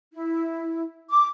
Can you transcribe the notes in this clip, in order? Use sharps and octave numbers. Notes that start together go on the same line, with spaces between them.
E4
D6